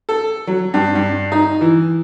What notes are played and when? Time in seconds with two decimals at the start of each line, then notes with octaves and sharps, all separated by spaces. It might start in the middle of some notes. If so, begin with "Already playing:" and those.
0.09 A4
0.47 F#3
0.74 G2
0.95 G2
1.32 D#4
1.61 E3